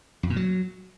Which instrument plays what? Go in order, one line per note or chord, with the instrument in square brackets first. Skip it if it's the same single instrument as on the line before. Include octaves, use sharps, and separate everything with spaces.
[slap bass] F2
A#2
F#3